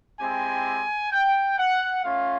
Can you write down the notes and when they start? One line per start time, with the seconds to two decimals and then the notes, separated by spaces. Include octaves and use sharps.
0.20 G#3 C4 E4 G4 G#5
1.11 G5
1.58 F#5
2.03 A3 C#4 F4 F5